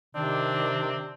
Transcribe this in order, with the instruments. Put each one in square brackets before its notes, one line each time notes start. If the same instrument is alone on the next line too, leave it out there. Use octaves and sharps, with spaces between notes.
[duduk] C3 [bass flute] D#3 [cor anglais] C4 [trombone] D4